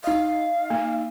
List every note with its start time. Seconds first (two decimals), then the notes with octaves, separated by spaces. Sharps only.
0.04 D#4 D#5 F5
0.70 A#3